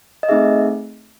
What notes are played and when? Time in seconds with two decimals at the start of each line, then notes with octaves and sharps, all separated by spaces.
0.23 D#5
0.29 A3 C4 D#4 G#4 E5